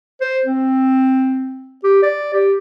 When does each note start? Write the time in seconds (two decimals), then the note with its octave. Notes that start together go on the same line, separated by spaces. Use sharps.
0.21 C5
0.45 C4
1.84 G4
2.03 D5
2.33 G4